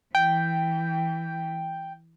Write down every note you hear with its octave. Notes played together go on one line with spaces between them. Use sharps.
E3 G5